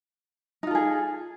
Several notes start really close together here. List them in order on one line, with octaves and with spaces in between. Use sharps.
D#4 F4 A4 G#4